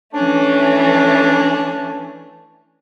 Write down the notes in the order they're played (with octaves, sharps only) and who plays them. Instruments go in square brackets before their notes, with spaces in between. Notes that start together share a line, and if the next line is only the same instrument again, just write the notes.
[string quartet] E3 A3 C#4 [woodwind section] D4